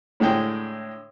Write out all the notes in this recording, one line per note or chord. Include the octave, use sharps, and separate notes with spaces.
A2 D3 G#3 G5